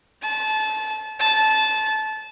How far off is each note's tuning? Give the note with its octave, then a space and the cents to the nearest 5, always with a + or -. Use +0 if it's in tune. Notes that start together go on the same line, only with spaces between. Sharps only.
A5 -25
A5 -20